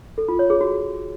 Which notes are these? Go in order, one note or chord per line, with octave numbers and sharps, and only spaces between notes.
A4
F4
C#5
G#4
F#4